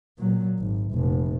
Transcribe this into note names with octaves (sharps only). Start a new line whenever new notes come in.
A#2 F#3
G#1
F1 A#2